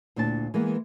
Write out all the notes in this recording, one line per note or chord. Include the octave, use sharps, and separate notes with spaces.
D2 A#2 D4 E4 F#4 A5
E3 G#3 A#3 B3